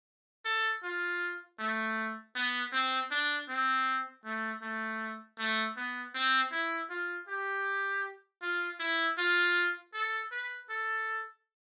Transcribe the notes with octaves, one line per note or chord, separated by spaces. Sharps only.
A4
F4
A3
B3
C4
D4
C4
A3
A3
A3
B3
C4
E4
F4
G4
F4
E4
F4
A4
B4
A4